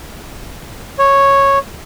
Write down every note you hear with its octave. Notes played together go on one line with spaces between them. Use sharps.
C#5